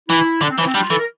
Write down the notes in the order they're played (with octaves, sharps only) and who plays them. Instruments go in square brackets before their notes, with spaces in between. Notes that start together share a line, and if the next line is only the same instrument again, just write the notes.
[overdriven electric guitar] E3 [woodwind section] E4
[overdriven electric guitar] D3 [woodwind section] D4
[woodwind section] C4
[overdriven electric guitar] E3 [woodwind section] F3
[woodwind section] C4
[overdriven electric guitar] G3 [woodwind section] D4
[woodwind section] F4
[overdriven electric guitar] E3 [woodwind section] A4
[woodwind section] A#4